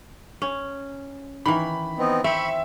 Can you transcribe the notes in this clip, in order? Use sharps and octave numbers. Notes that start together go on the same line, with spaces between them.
C#4
D#3 E3 B5
B3 C4 D#4
C4 E5 B5 C#6